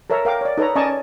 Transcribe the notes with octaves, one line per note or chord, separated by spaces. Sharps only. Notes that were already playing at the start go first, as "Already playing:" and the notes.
A4 A#4 C#5 E5 A#5
A#4 F5 G5 D6
C#5 D5
D#4 A4 B4 C#5 A#5
C#4 D5 D#5 G#5 A5 C#6